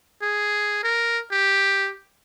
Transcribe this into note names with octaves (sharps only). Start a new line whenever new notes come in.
G#4
A#4
G4